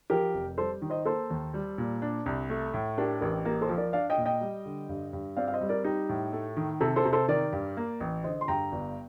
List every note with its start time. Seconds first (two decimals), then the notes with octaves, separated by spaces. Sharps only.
0.10 F3 G4 A#4
0.34 F1
0.58 G3 A4 C5
0.82 D#3
0.90 C5 D#5
1.05 A#3 A4 C5
1.30 D#2
1.54 G3
1.78 A#2
2.02 D4
2.26 C2
2.50 A3
2.74 A2
2.98 D4 G4 A#4
3.21 A1 G4 A#4
3.45 A#3 G4 A#4
3.61 A4 C5
3.69 F3
3.77 A#4 D5
3.93 D4 D5 F5
4.10 D#5 G5
4.18 A#2
4.26 D#5 G5
4.41 G3
4.66 D3
4.89 G2
5.13 G2
5.37 C4 D5 F5
5.48 F5
5.53 C5 D#5
5.61 G3
5.69 A#4 D5
5.84 D#4 G4
6.09 A2
6.33 A3
6.57 D#3
6.81 C3 A4
6.96 A4 C5
7.05 C3
7.13 A4 C5
7.28 D#3 A#4 D5
7.52 G2
7.77 A#3
8.00 A1
8.24 D3 C5 D#5
8.41 C6
8.48 G2 G5 A#5
8.72 G1